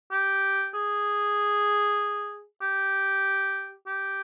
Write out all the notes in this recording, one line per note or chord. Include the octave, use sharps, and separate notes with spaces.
G4
G#4
G4
G4